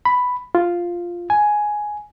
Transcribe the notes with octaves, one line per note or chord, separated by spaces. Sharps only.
B5
F4
G#5